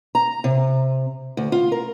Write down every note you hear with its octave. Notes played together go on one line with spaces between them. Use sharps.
A#5
C3
D2
F4
A#4